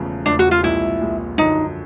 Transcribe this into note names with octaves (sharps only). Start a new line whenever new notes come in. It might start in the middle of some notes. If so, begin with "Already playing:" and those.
Already playing: E1 E2 C#3 F3 A3
E1 E2 C#3 F3 A3 D4
F#4
F4
C2 A#2 F3 G#3 E4
C2 A#2 F3 G#3
F#2 D3 F3 D#4